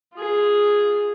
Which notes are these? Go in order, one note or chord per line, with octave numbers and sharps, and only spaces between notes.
F4 G#4